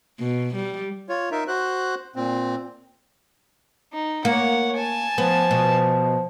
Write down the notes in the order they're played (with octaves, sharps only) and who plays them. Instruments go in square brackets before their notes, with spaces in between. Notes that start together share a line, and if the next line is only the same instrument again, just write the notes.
[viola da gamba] B2
G3
[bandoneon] F4 C#5
D#4 A#4 E5
F#4 C5 F#6
A#2 C4
[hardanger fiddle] D#4
[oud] A#3 [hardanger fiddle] C#5 F#5
[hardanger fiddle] G#5 A5
[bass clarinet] F3 [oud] B3
[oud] B2